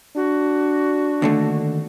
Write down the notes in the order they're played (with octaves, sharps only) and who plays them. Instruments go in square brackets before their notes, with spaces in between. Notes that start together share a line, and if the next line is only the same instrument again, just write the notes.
[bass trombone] D4 [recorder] F#4
[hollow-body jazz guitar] D#2 D3 A3